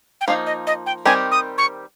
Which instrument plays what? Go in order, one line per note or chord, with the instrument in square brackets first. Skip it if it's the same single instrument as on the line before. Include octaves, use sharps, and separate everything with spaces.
[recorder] G5
[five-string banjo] F3 A#3 D#4 [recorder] F5
[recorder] D#5
D#5
G5
[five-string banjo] D#3 G3 C4 G4 A#4 [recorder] G#5
[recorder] D#6
C#6